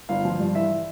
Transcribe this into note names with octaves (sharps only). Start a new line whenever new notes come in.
G1 F5
F3
G2
E3 E5